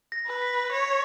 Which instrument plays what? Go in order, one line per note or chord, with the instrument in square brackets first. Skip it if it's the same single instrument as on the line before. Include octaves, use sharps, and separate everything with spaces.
[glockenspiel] A#6
[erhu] B4
[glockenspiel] B6
[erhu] C#5 [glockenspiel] A#6